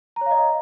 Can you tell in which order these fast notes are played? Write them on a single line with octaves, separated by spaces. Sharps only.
A#5 C#5 F5 D#5